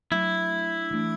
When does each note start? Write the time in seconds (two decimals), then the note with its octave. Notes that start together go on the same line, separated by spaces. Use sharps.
0.11 F#3 A3 D4 E4
0.91 E3 A3 D4